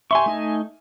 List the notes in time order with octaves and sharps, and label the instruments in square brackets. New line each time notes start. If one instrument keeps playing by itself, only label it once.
[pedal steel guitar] G4 C6 C#6 [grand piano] E5 G#5
[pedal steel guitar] A3 D#4 D#5